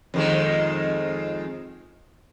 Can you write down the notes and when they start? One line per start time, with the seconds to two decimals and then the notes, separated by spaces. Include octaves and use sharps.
0.14 F2 D#3 G#3